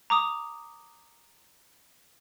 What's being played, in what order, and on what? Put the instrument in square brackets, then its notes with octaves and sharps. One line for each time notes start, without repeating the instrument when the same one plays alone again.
[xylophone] A#5 D6 D#6